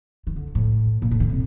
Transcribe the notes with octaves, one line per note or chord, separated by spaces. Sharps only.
D#3
D3
A2
A#2
A2
D#3
C3